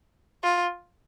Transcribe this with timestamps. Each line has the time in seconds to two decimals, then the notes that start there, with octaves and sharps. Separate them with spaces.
0.43 F4